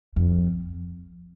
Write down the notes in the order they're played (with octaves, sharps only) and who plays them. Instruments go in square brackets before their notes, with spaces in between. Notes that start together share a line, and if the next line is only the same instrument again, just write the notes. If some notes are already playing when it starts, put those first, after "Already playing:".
[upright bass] F2